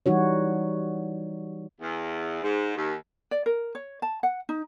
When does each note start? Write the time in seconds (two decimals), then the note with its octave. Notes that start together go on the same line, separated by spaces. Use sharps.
0.06 E3 G3 D#4 F#4 C#5
1.81 E2
2.42 G#2
2.76 D#2
3.31 D5
3.46 A#4
3.75 C#5
4.02 A5
4.23 F#5
4.49 D#4